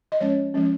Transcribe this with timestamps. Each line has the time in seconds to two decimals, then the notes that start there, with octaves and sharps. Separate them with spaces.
0.12 D#5
0.20 F3 G#3 C#4 C#5
0.54 F3 G#3 C#4